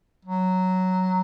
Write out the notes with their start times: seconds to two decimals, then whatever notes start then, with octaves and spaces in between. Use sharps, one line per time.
0.25 F#3